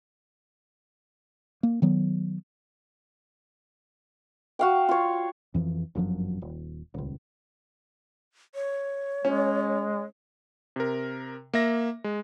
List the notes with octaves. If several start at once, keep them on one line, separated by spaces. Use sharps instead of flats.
A#3
D#3 F#3 B3
F#4 F5 G5
F4 C#5
F2 E3 F3
G1 F#2 F3 F#3
D#1
D#1 C#2
C#5
G#3 C#4
C3 A#4
A#3 E5 A#6
G#3